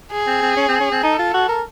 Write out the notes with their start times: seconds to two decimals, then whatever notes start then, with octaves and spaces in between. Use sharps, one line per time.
0.12 G#4
0.27 C4
0.42 C4
0.56 C#4
0.68 C4
0.80 C#4
0.92 C4
1.03 D#4 A4
1.19 F4
1.34 F#4
1.49 A#4